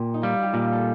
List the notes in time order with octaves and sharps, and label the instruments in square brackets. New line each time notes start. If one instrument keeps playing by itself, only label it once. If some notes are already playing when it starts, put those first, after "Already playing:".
Already playing: [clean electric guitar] A#2 [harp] G4
[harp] D#4
[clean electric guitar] G3 [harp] F4
[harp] G4
[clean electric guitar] A#2 [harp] F4
[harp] A4